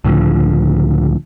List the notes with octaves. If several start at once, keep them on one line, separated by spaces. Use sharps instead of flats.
C#2 A2 D3 F3